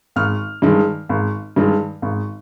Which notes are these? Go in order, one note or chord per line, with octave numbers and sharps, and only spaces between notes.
G#1 F6
G2 D#3 G#3
G#1
G2 D#3 G#3
G#1